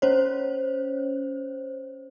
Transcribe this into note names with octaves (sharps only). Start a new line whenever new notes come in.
C#4 C5 C#5